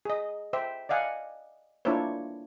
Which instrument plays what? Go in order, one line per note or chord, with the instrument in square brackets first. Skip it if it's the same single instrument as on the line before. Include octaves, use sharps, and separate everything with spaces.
[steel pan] G#4 D#5
C5 E5 G5
D5 D#5 F5 F#5 G#5
A#3 D4 E4 F4 C5 C#5